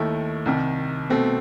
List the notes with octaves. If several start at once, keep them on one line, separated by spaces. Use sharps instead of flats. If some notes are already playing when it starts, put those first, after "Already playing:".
Already playing: D#2 D#3 A3 E4
C2 C3 D#3
B2 A3 C4